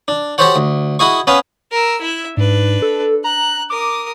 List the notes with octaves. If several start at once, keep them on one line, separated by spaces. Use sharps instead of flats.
D4
F#4 G4 A4 C5 C#5 F#5
D2
E4 F#4 G#4 D#5 C#6
B3 C#4 B4 F5 G#5
A#4 E6
E4 E5
G#2 D4 B4
A4
A#5 F#6
A#4 D6 D#6